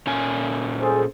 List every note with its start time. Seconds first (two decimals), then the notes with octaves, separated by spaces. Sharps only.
0.07 A#2 C#4 G#5
0.81 G#4 A4 C5